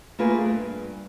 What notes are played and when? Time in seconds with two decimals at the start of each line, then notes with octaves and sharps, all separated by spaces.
0.19 A3 A#3 F4 G#4 B4
0.46 G2